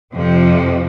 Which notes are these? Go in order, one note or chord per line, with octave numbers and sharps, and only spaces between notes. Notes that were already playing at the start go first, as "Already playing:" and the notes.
F2 C3 F3